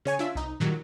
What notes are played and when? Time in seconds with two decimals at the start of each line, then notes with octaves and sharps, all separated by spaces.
0.05 C#3 C#5 G#5
0.19 D4 F4 E5 B6
0.35 C2 D#4
0.60 A#2 D#3 F#3 G3